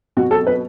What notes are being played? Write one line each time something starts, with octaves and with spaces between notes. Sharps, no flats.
B2 F#4
A4
B4